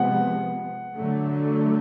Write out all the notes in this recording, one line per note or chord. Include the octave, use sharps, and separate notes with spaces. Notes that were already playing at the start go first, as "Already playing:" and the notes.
Already playing: C3 F3 G#3 B3 F#5
D3 F#3 A3